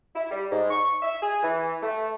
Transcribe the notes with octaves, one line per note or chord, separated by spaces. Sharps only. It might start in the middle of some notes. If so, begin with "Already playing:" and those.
E4
G3
G#2
C#6
E5
G#4
E3
A3